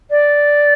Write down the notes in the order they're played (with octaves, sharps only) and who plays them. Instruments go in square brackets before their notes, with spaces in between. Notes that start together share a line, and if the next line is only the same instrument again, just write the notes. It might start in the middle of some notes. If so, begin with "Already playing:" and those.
[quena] D5